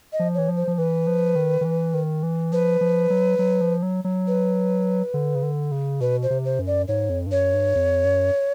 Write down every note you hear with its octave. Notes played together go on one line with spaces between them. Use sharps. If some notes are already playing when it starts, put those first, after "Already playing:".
D#5
F3
E3 C#5
F3
C5
F3
E3 B4
F3
D#3
D#3
E3
D#3
E3
F3 B4
F3
F#3
F#3
F3
F#3
F#3
B4
D3
C#3
D3
C#3
B2 B4
C5
C3
C5
F#2
D5
G#2 C#5
F2
G2
F#2 C#5
G2
F2
F#2